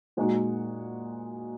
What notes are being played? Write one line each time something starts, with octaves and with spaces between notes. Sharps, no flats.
A#2 G#3 D#4 F#4